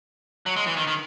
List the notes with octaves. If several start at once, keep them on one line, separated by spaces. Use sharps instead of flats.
F#3
G#3
E3
D#3
D#3